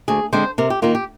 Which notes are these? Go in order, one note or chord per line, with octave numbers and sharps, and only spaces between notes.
D2 G#4
D3 G#3 C4 C5
C3 A#4
G4
D#3 A#3 F4
G4